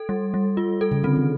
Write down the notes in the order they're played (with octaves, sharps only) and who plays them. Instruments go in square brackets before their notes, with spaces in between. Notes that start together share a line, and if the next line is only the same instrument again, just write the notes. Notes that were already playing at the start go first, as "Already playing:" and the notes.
Already playing: [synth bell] A4
G3
G3
F4
A4
[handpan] C#3
[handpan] D3 [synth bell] C4
[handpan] D#3